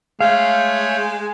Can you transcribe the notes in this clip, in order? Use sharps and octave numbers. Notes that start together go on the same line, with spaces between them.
G#3 A3 C#5 F5 G6